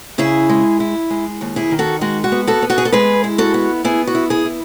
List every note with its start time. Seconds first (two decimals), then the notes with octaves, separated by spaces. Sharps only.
0.18 C#3 E4 G#4
0.49 G#3
0.80 E4
1.10 G#3
1.41 D#2
1.56 E4 G#4
1.71 D#3
1.79 F#4 A4
2.01 G#3 F#4
2.24 F#4
2.32 B3
2.47 F#4 A4
2.62 B3
2.70 F#4 A4
2.78 G#4
2.85 A4
2.92 G#3 G#4 B4
3.24 E4
3.38 F#4 A4
3.54 B3
3.84 B3 E4 G#4
4.07 F#4
4.15 E4
4.30 E4 G#4
4.45 E4